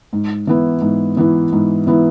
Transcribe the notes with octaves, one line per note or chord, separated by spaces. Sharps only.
G#2
E3 B3 E4
G#2
E3 B3 E4
G#2
E3 B3 E4